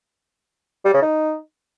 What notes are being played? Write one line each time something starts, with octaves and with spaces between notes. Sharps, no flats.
G3
C#3
D#4